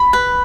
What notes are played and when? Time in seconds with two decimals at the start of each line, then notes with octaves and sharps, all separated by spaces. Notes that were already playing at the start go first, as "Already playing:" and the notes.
Already playing: B5
0.13 B4